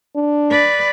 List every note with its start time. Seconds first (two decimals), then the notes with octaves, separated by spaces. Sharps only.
0.16 D4
0.51 B4 D5